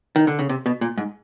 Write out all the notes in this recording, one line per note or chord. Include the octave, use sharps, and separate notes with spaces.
D#3
D3
C#3
C3
B2
A#2
G#2